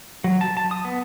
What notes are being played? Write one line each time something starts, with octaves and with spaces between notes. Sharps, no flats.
F#3
A5
A5
D#6
B3